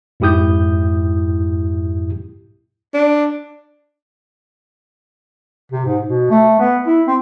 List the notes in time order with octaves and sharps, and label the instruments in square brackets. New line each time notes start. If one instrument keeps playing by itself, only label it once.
[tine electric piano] F2 G#2 E4 G4 D#6 G6
[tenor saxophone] D4
[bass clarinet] C3
G#2
B2
A3
B3
E4
C4